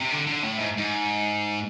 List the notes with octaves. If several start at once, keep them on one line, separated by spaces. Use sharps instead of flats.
C3
D3
D3
A2
G#2
G#2